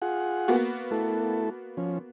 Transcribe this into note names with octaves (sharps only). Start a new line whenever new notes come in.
F4 G#4 F#5
A#3 B3 F#4
A3 E4 A4
F3 C#4